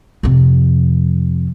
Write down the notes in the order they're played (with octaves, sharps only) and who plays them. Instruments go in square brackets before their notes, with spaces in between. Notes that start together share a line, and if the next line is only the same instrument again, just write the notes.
[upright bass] F2 C3